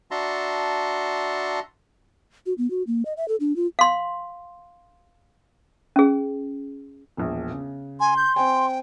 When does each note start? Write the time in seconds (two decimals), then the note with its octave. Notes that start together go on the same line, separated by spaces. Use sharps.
0.11 D4 F#4 E5 A5 A#5 C6
2.46 F#4
2.58 B3
2.70 F#4
2.87 A#3
3.05 D#5
3.17 E5
3.28 A4
3.40 D4
3.56 F4
3.79 F5 C6
5.96 C#4 G#4
7.17 E1 A#1
7.51 C#3
8.00 G#5 C6
8.17 G6
8.36 C4 G5 G#5